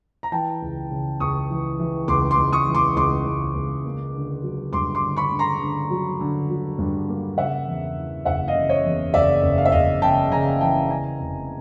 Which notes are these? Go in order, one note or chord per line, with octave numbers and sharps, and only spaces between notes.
A#5
E3 G5 A5
C#2
C#3
C#2 C#6 D#6
E3
E3
C#2 C6 D6
C6 D6
C#2
C#6 D#6
E3
C6 D6
C#2 C6 D6
C#2
C#2
A#3
D3
F#3
G2 C6 D6
C6 D6
D3
B5 C#6
D3
A#5 C6
D3
F#3
D3
F#3
G2
A#3
C#3 E5 F#5
E2
E3
F#1 E5 F#5
D#5 F5
C#3
C#5 D#5
E2
F#1 D5 E5
F#1
F5
E5
F#1 D#5 F5
C#3 G5 A5
C#3 G#5 A#5
E3 G5 A5
C#3 G#5 A#5
F1